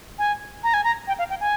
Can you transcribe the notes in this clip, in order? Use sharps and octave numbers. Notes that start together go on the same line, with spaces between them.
G#5
A#5
G#5
A#5
G5
F5
G5
G#5